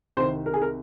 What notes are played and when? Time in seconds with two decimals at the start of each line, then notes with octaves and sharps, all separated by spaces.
0.17 C2 C3 D#3 C5
0.46 A#4
0.54 G#4
0.62 A#4